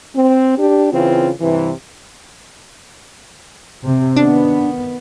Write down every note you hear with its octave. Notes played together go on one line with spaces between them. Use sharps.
C4
D4 G4
C#3 E3 C4 F4
G2 C3 E3
C3
D#3 B3 D4